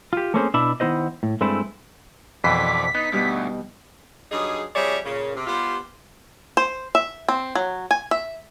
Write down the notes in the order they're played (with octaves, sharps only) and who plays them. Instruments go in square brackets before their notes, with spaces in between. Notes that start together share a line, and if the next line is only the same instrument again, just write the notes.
[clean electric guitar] F4 G4
A3 A#3 C4 C#4 G#4 C5
B2 D4 E4 E5 B5
D#3 B3 E4 C5 D#5
A2
G2 G#3 A3 C4 D4 E4
[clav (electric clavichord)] F2 B2 E3 [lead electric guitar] C5 D5 [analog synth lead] B6
[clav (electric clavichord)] B3 [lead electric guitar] D#4
[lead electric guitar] D2 [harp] B2 G3 D#4
[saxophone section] G2 F#3 D#4 G#4
F2 G3 G#4 C#5 D5 E5
A#2 C#3
C3
G3 B3 F4 G4 C5
[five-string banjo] C5
E5
C4
F#3
G#5
E5